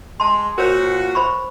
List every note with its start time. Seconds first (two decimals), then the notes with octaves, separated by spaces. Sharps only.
0.20 G#3 A5 C6
0.58 A#2 F4 F#4 A#4 C5 C#5
1.15 C5 B5 C#6